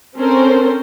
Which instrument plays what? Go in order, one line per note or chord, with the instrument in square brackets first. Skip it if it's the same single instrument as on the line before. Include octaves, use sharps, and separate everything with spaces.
[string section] C4 C#4 A4 A#4 C5